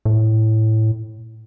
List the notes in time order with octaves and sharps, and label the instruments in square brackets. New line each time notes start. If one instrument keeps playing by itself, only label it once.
[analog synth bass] A2